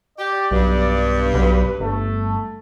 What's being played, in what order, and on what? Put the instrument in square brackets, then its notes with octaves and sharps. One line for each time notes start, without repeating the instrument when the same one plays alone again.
[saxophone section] G4 [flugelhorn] D5
[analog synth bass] B1 [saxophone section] G2
[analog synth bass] B1 [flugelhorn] B4
[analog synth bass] G1 [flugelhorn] A3